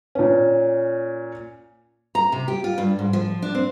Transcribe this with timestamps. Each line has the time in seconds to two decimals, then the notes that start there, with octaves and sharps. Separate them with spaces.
0.15 A#2 C#4
2.15 A#5
2.32 C3
2.48 G4
2.64 F4
2.78 G2
2.99 G#2
3.13 F3
3.42 D4
3.55 C4